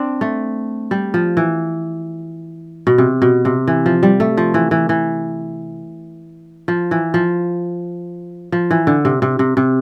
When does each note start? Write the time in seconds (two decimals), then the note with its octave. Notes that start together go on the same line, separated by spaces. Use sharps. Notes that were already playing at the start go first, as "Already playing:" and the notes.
Already playing: C4 D4
0.21 A3
0.91 G3
1.14 F3
1.37 E3
2.87 B2
2.98 C3
3.22 B2
3.45 C3
3.68 E3
3.86 F3
4.03 G3
4.20 A3
4.37 F3
4.54 E3
4.71 E3
4.89 E3
6.68 F3
6.91 E3
7.14 F3
8.52 F3
8.71 E3
8.87 D3
9.05 C3
9.22 C3
9.39 C3
9.57 C3